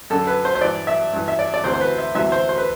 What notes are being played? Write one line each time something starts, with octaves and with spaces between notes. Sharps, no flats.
F#2 D3 A4
B4
C5
C5
G2 E3 D5
E5
G2 E3
E5
D5
D5
D2 C3 E3 C5
C5
B4
E5
D2 C3 E3 E5
C5
C5
B4